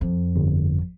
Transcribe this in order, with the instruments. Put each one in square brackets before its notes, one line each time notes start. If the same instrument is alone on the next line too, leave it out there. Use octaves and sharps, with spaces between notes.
[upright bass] F2
[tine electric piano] G1